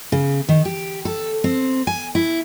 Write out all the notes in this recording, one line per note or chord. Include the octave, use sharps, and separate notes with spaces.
C#3
D#3
G4
A4
C4
G#5
E4